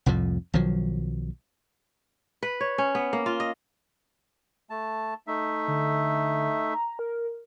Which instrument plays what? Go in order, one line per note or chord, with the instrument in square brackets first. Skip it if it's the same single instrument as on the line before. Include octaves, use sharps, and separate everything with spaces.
[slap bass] C2 F2 A2 F3
B1 D#3 F3 F#3
[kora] B4
C#5
C#4
B3
A#3
F4
D#5
[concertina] A3 A5
A3 D#4 E5
[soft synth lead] D3
A#5
A#4